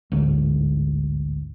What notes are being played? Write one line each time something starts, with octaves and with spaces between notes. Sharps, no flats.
A1 D2 G#2